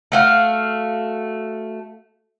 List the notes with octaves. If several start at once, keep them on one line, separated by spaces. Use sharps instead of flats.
A3 F#4 F5